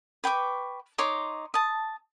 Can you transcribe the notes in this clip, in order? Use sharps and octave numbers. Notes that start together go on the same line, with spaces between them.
B4 G5 C#6 D6
D#4 C#5 C6 D6
A5 D#6